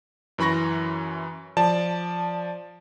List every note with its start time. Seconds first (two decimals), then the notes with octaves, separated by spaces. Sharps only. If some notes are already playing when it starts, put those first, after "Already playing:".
0.38 F#2 E3 B5 C#6 A#6
1.57 F3 D5 A5